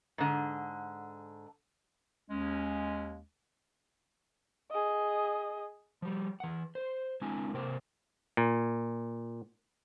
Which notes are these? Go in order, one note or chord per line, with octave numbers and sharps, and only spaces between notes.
G#2 D3
D#2 G#3 C#4
G#4 D#5
F3 G3
E3 F#5
C5
G#3 C4 D4 E4 G#5
C3 A#3 A#4 C5 G5
A#2